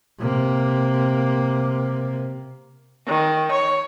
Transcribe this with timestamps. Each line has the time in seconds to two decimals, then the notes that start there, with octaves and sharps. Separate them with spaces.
0.19 C3 A#3
3.07 D#3
3.51 C#5